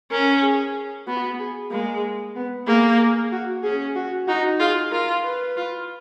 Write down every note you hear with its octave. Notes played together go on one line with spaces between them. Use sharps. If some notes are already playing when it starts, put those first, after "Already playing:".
C#4 A#4
G#4
B3 F#4
G#4
G#3 A#3
B3
A#3 G#4
G#4
F#4
C#4 G#4
F#4
D#4 F#4
F4 G#4
F4 A#4
B4
F4